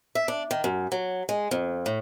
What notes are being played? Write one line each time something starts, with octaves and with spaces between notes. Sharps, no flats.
E5
D4
D#3
F#2
F#3
G#3
F2
A2